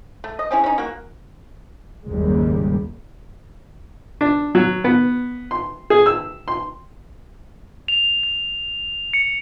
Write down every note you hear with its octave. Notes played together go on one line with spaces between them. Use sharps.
A3
D#5
C4 C#4 E4 G#4
C#4 D#4
A#3 F#4
F#1 D#2 G#2 G3 G#3 A#3
D4
F#3
B3
C6
G#4
E6
C6
F7
F7
C#7